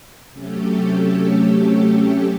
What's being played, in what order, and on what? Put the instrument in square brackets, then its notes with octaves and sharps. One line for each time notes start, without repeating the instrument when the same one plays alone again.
[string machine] C3 F#3 A3 C#4 G4 A4